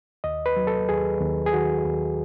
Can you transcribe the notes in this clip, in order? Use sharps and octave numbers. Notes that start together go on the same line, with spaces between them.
D#2 D#5
B4
F#3
A4
D#2 G#4
D#2
G#4
D#3 F#4
D#2